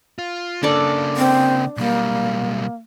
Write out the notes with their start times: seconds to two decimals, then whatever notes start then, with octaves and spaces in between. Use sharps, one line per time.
0.19 F4
0.63 C#3 A#3 D4 A4 D5
1.17 C4
1.77 B1 G3 A#3